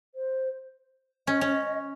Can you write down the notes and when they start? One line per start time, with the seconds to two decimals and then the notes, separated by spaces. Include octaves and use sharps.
0.15 C5
1.27 C#4 D#5
1.41 C#4